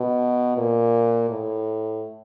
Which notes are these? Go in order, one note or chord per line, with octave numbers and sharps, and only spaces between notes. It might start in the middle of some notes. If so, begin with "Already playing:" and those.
Already playing: B2
A#2
A2